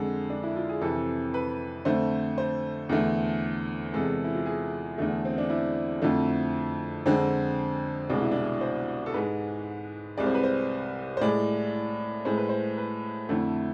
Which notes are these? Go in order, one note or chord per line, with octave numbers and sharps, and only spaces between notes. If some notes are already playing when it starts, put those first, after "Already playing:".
Already playing: F2 D3 G#3 A4
D4
E4
F4
G#4
F2 C3 E3 A4
B4
F2 D3 A3 C5
C5
E2 D3 A3
E2 C3 G#3 A4
E4
F4
G#4
E2 D3 A3
C4
D4
E4
F2 D3 F3 A3
F2 D3 G#3 C4
C2 B2 G#3 D4
E4
D4
C5
A4
G#2 G#3 B4
C2 C3 G#3 D5
C5
B4
C5
C5
A2 G#3 D5
A2 G#3 C5
B4
C5
B4
F2 D3 A3 E4